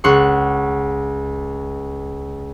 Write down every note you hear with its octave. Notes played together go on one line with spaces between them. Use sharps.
C#2 F#5 C6 C#6